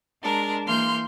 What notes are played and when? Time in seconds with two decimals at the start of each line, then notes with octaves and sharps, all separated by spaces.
0.22 G#3 D4 A#4
0.65 E3 A#3 C6 F6 G6